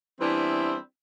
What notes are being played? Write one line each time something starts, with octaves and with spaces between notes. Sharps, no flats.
E3 G3 B3 C4 D4 E4